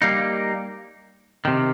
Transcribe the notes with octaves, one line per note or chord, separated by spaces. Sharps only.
G3 A#3 D#4
C3 D#3